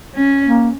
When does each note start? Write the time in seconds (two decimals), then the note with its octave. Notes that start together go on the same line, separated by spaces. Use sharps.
0.15 C#4
0.44 A#3